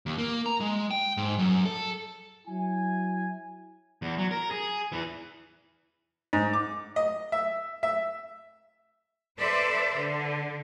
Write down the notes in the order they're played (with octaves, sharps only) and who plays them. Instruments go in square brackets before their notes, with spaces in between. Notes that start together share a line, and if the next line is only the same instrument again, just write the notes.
[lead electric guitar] D#2
A#3
A#5
G#3
G5
G#2
F#2
A4
[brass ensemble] F#3 E4 G#5
[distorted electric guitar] E2
F#3
A#4
G#4
E2 E3
[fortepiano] G#2
D6
D#5
E5
E5
[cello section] A4 B4 C5 D5 E5
D3